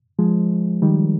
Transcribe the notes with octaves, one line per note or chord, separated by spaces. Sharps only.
F3 G#3
D#3 G3